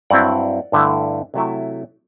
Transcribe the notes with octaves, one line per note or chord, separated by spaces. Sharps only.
G2 F#3 C4 E4 D5 F#5
G2 D3 A3 E4
C3 F#3 A3 E4